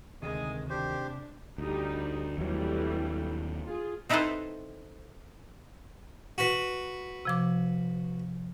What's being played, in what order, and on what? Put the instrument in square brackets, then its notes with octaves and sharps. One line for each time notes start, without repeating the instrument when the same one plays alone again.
[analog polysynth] D2 D#3 [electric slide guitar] C3 [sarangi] G#3 [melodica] G#4 G#5
[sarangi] D4 [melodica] G4 C5
[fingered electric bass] D2 [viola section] G3 D#4
[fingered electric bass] D#2 F#3 [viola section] E3 G3 A3
[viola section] F4 G#4
[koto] C4 D#4 E4 A4 B4 C5
[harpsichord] F#4 B4
[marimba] C3 F3 D6